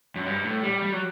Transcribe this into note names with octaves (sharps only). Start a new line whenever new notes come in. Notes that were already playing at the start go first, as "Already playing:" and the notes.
F#2
G2
A2
G3
G3
F#3